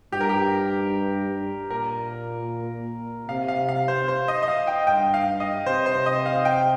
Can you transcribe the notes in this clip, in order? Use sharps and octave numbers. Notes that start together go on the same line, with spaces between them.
G2 G4
A#4
G4
A#2 A#4
C3 F5
F5
F5
C5
C5
D#5
D#5
F5
G5
G2 G5
F5
D#5
C3 C5
C5
D#5
F5
G5